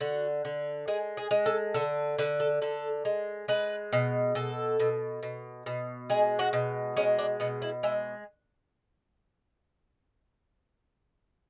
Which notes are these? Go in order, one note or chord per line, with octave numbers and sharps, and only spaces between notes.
D3 F#4
D3
G#3 G#4
G#4
G#3
A4
D3 A4
D3 B4
A4
D3 A4
G#3
G#3 B4
B2
B2 A4
B2
B2
B2
G#3 G#4
F#4
B2
G#3 C#4
D4
B2 B3
E4
G#3 E4